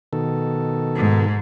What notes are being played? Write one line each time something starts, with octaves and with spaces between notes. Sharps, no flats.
B2 D#3 A4
G#2